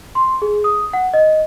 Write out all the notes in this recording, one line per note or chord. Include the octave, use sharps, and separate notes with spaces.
C6
G#4
D#6
F#5
D#5